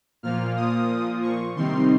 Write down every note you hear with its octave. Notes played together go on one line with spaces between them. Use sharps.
A#2 F3 A#3 F4 F6
D#6
C#6
C3 D#3 G3 C4 D#4 C6